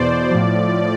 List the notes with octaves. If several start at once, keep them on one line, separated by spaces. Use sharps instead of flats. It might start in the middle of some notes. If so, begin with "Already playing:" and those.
Already playing: E2 B2 C5 D5
A2 F3